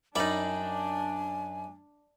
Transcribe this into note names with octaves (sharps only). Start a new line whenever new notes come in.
F#2 G3 D4 D#4 D5 G#5 B5